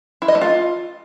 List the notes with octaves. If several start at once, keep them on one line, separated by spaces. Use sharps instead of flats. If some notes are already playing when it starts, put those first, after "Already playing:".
E4
D#5
A3
F4